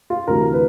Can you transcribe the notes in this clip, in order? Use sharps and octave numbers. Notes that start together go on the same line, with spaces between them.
F4
D2 C3 E3 A#4
B4